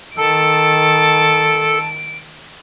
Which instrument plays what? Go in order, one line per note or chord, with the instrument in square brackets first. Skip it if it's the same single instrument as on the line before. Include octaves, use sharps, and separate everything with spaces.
[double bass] D#3 [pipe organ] A4 [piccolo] A5 [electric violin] D7